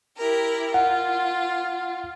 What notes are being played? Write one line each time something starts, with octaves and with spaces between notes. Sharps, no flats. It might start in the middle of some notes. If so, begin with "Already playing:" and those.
E4 G4 A#4
F4 F#5